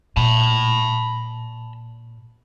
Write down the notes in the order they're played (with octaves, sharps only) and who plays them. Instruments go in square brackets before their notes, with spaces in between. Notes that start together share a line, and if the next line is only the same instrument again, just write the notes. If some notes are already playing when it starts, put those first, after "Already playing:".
[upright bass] A#2 [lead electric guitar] A5 B5